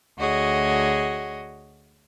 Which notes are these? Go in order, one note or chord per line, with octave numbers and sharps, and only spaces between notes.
D2 F#4 G#4 C#5 D#5